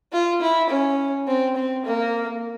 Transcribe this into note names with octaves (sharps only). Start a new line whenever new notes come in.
F4
E4
C#4
C4
C4
A#3